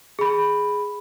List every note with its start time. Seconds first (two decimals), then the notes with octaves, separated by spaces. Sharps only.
0.19 G#4 B5